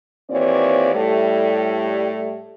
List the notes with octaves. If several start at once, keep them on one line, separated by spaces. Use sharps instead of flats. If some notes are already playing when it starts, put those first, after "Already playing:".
D#2 A#2 E3 C4 C#5 D5
A2 G3 A3